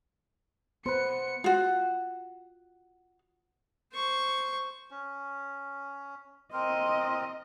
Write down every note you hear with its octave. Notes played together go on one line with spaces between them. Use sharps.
B3 B4 C5 C#7
F4 F#4
C5 C#6
C#4
C4 A#4 D#5 C6